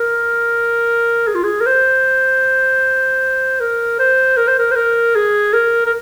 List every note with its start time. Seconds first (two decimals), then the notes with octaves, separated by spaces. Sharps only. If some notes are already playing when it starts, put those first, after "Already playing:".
Already playing: A#4
1.27 G#4
1.35 F4
1.44 G#4
1.61 A#4
1.66 C5
3.60 A#4
3.99 C5
4.37 A#4
4.48 C5
4.58 A#4
4.71 C5
4.75 A#4
5.15 G#4
5.53 A#4
5.86 A#4